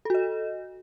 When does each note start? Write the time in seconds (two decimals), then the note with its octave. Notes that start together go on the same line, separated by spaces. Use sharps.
0.05 A4
0.10 F#4
0.14 D#5